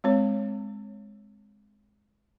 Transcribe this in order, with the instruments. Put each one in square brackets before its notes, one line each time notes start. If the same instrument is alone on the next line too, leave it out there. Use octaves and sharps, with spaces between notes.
[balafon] G#3 C4 C#5